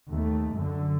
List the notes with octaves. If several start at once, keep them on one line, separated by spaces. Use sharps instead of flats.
D#2 A3
F#2 D3